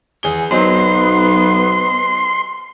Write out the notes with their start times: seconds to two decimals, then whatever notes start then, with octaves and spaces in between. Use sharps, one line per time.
0.23 E2 G#4 G7
0.51 B1 F#3 B3 C4 D#4 C6